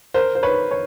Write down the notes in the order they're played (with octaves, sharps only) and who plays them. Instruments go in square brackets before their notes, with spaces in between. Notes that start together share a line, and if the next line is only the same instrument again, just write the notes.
[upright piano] A#4 C5
C5
B4 C#5
C#5